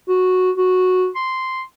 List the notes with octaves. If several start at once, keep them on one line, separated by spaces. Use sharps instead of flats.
F#4
F#4
C6